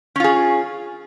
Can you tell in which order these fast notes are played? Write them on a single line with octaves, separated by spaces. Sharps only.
C#4 F4 G#4